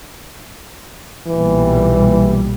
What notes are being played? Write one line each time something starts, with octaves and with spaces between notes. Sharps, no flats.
B1 A#2 E3 G3